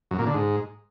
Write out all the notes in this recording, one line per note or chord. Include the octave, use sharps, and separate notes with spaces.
F#2
A#2
D3
G#2